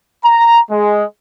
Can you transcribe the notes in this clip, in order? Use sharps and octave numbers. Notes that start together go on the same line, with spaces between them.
A#5
G#3